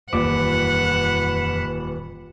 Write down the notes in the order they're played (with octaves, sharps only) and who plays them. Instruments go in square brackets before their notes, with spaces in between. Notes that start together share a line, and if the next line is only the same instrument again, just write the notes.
[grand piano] D#1 A#2 D6 [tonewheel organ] F2 E3 [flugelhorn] B4 [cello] F#5